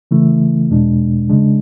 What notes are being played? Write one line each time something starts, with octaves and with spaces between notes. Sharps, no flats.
C#3 E3 A3 E4
E2 B2 G#3 D4
C#3 G#3 D4